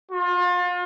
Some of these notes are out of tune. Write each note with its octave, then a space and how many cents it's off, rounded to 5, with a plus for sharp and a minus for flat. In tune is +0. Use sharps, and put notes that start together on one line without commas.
F4 +35